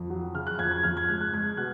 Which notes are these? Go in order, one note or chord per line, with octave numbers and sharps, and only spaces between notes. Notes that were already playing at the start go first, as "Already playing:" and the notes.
Already playing: F2
F#3
C#3 F6
F#6
F2 G#6
G#6
F2 F6
G#6
G#3 F#6
F#6
G#3 G#6
B2 F#6